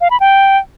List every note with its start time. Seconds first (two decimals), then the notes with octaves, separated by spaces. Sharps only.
0.01 F5
0.11 B5
0.20 G5